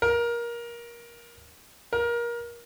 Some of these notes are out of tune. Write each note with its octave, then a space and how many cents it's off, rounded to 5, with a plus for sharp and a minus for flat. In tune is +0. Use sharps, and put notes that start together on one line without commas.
A#4 +20
A#4 +25